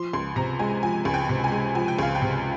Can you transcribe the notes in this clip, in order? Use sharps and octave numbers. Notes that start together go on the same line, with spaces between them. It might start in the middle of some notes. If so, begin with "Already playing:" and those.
Already playing: F3 C6
C#2 C6
C3 A#5
G#3 G#5
F3 G#5
C#2
G5
C3
G#5
G#3
F3 G#5
G5
C#2 F5
G5
C3